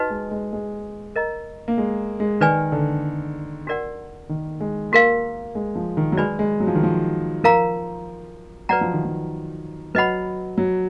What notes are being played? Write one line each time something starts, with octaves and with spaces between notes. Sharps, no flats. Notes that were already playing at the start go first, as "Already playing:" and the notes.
Already playing: D#4 F#4 B4 D#5
G#3
G#3
G#3
A#4 D#5 A#5
A#3
G#3
G#3
D#3 B4 D5 G#5
D3
D4 F#4 A#4 D5 F#5
D#3
G#3
A#3 F#4 A#4 F5
G#3
F3
D#3
F#3
G#3 B4 D5 G#5 B5
G#3
F#3
F3
D#3
F3
F3 A#4 F5 A#5
F#3 B4 D5 F#5 A#5
F3
D#3
F3
F#3 B4 D#5 F#5 B5
F#3